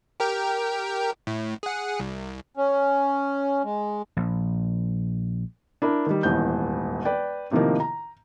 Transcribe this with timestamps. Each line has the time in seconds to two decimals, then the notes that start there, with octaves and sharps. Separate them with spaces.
0.20 G4 A#4 G5
1.27 A2
1.63 G#4 F#5
2.00 C2
2.57 C#4
3.64 G#3
4.17 A#1
5.82 D4 E4 A#4
6.06 D#3 G3
6.23 D#1 G#1 E2 G6
7.05 B4 D5 G5
7.51 A2 C3 D#3 F3 A#3
7.80 A#5